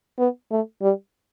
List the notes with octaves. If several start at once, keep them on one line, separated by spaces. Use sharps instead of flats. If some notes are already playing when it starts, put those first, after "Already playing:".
B3
A3
G3